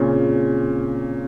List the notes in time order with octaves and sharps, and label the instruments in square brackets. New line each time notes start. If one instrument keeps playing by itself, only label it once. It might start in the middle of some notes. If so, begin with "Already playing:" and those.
Already playing: [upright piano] A#2 C#3 [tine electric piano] C4 F4 G#4 C#5